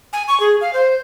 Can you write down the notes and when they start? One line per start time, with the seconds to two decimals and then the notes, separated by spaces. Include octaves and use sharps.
0.13 G#5
0.28 C#6
0.40 G#4
0.61 F5
0.74 C5